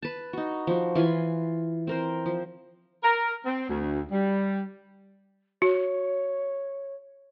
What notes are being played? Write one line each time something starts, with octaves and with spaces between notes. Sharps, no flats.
B4 A5
D#4 F#4
F3 F#4
E3 F4 G#5 B5
C4 A#4 C5
F3
A#4
C4
D2
G3
F#4 C#5